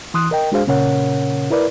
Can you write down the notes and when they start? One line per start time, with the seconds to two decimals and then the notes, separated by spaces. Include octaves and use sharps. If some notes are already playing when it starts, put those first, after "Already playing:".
0.14 E3 C6 D#6 F#6
0.31 A#4 D#5 G5
0.52 G#3 D4 F#4 G#4 C5 F5
0.67 A#2 C#3 C#4 A#4 C#5 F#5
1.50 E4 A#4 B4 D5